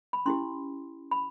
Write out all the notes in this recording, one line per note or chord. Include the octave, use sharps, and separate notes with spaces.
B5
C#4 E4 G4 C6
B5